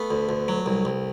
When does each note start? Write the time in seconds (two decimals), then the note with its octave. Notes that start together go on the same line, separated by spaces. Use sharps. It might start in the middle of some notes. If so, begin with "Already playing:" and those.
Already playing: A3 B3
0.11 D2
0.29 D2
0.48 F#3
0.66 C2
0.85 C2